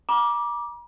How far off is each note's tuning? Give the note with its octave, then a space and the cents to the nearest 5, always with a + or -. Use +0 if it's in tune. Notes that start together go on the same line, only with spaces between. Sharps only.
A#5 +45 D6 +0